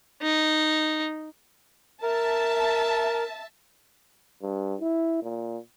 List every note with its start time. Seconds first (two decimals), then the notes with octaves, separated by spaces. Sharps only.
0.22 D#4
2.02 A#4 E5 A5
4.43 G2
4.81 E4
5.23 A#2